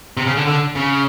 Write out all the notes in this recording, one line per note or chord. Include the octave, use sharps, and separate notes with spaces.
C3
C#3
D3
D3
C#3